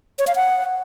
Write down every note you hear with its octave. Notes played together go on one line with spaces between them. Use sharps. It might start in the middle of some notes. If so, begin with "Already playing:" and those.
C#5
F5
F#5